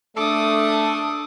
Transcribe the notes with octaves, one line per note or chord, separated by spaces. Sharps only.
A3 D4 A4 D6 D#6